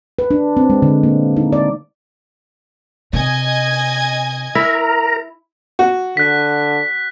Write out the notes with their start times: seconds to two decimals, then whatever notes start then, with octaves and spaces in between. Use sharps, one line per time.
0.19 B4
0.31 D4
0.57 C4
0.70 G#3
0.82 D3
1.03 A#3
1.37 D#4
1.53 D5
3.13 C3 D#5 G#5 G#6
4.55 E4 A#4 A#5
5.79 F#4
6.17 D3 F#6 B6